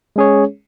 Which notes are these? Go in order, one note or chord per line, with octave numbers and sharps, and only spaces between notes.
G#3 C#4 G#4 C#5